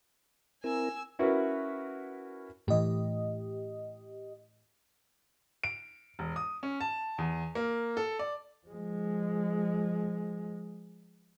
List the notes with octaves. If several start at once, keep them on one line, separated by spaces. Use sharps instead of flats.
C4 E4 A#4 G#5 E6
C#4 E4 F#4 A#4 B4
A2 E3 G4 D#5
D7
E1
D#6
C#4
A5
E2
A#3
A4
D5
F3 G#3